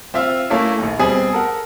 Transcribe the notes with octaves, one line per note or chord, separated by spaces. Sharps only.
C4 F4 E5 F5
A3 A#3 C#4 E4
A#1 D#2
B2 G3 C4 G#4
A4 A#4 F#5